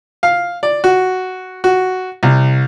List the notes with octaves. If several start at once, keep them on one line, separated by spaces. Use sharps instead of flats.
F5
D5
F#4
F#4
C2